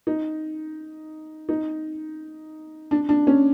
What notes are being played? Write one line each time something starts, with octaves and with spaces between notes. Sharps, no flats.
D#4
D#4
D4
D4
C#4